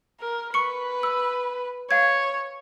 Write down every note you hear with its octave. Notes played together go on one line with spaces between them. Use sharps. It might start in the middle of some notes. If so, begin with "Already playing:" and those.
A#4
B4 C#6 C#7
E6
C#5 F5 G#6